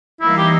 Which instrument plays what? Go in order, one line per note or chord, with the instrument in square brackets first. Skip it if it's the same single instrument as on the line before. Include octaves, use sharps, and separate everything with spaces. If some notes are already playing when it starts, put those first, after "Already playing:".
[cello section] E3 G3 A#3 D#4 [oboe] E4
[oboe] G4